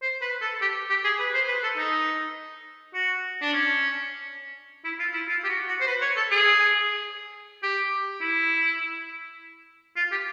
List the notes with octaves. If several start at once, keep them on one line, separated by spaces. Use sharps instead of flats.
C5
B4
A4
G4
G4
G#4
B4
C5
B4
A4
D#4
F#4
D4
C#4
E4
F4
E4
F4
G4
F#4
F#4
C5
B4
C#5
A4
G#4
G4
E4
F4
G4